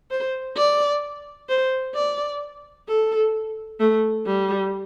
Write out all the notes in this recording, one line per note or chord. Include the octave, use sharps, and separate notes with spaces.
C5
D5
C5
D5
A4
A3
G3